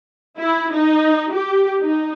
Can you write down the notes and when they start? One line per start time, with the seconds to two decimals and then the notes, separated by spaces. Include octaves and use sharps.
0.36 E4
0.72 D#4
1.31 G4
1.80 D#4